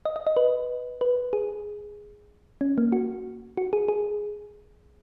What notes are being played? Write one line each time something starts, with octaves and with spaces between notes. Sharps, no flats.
D#5
D#5
D#5
B4
B4
G#4
C#4
A#3
F#4
F#4
G#4
G#4